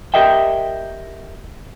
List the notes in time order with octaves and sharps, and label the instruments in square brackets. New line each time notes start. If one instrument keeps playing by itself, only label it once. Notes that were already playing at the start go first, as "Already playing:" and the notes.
[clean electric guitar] G4 A#4 D#5 E5 G5